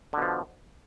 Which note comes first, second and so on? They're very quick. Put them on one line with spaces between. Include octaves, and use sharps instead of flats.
D3 B2 F3